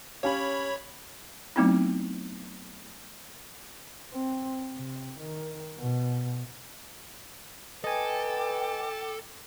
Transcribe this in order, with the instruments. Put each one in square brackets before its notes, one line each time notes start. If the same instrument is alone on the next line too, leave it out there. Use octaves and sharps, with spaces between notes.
[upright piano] C#4 G4 F5 [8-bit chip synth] C#5 B5
[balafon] F#3 A3 B3 C4 D#4 E4
[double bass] C4
C3
D#3
B2
[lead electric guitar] A4 [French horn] B4 [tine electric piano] D#5 G#5 [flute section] G5 D6